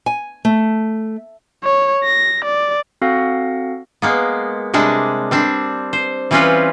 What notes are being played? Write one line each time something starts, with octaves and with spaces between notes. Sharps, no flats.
G#5
A3
C#5
A#6
D5
C4 F#4 A4 F5 F#5 A#6
G#3 A#3 B3
C3 G3 G#3 D4
G3 C4 D4
C5
E3 G3 C4 C#4 F4 B4